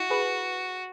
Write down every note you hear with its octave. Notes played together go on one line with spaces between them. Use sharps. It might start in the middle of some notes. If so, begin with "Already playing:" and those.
Already playing: E4 F#4
G#4 B4